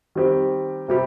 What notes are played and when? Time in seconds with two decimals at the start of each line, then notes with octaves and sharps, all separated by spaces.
0.15 D#3 G3 C4 G4
0.88 C3 G3 C4 G4